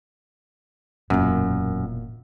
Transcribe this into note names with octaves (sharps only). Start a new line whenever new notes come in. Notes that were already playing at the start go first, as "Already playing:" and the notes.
E1 F#2 A#2